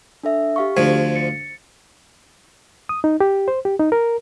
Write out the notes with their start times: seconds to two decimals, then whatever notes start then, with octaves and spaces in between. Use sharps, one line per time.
0.23 D4 A4 E5
0.56 G4 F5 C#6
0.77 D2 F3 G#6
1.16 A6 C#7
2.89 D#6
3.04 D#4
3.20 G4
3.48 C5
3.65 G4
3.79 D#4
3.92 A#4